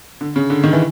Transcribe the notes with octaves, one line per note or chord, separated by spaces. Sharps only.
D3
C#3
D3
D#3
E3